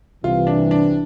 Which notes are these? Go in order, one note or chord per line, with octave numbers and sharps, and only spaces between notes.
C2 C3 E3 F4
D4
D4